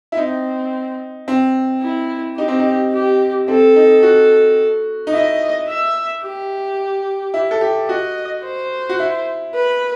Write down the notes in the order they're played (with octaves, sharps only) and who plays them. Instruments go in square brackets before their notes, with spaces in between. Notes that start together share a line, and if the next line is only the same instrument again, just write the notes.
[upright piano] E4
[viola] C4 [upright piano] D#4
[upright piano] C4
[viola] E4
[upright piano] D#4 [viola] G4
[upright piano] C4
D#4
[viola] G4
[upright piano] C4 [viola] A4
[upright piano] D#4
F#4
D#4
[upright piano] E4 [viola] D#5
[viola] E5
G4
[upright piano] E4
A4
G4
[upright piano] F#4 [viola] D#5
[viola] C5
[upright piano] F#4
E4
[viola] B4